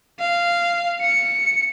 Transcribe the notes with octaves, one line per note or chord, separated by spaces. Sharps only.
F5
C#7